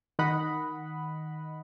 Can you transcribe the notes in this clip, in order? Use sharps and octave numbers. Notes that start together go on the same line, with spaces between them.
D#3 D#5 F#5 B5